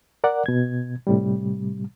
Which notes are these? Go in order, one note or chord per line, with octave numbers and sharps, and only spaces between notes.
A#4 D5 F#5
B2 G#6
A2 C3 G3